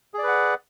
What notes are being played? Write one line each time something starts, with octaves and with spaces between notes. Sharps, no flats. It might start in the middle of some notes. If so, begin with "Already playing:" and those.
G#4 B4 D5 F#5